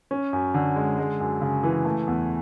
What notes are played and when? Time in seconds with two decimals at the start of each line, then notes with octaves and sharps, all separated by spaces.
0.11 C#4
0.33 F#2
0.54 D3
0.76 G#3
0.98 G#3
1.20 F#2
1.41 C#3
1.63 E3
1.85 A3
2.07 E2